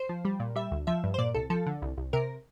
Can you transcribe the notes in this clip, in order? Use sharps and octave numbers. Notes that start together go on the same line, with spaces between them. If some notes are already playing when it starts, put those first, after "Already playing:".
Already playing: C5
F3
G3
A#2
G3 E5
D2
F3 E5
G2
C5
A#2 D5
C2 A4
F3 A4
D3
C2
C2
C3 A#4